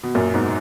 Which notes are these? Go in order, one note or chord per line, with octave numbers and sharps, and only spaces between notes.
B2
F#2 A#2
G#2 B2